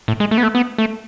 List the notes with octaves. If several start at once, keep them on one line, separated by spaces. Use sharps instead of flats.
A2
G#3
A3
B3
A3
B3
A3